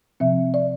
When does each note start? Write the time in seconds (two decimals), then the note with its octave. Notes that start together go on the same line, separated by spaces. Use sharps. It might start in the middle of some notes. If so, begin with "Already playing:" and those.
0.20 C3 F3 C4 E5
0.54 D5